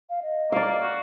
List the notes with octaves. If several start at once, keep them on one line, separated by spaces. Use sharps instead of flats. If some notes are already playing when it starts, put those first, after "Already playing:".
F5
D#5
A#3 D5 F5
F#4